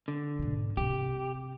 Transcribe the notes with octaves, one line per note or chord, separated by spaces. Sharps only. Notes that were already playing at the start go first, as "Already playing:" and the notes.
D3
G#2 B2
C3 C4 G4